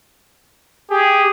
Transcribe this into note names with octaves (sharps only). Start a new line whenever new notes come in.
G4 G#4